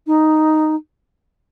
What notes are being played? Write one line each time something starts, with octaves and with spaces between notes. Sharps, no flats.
D#4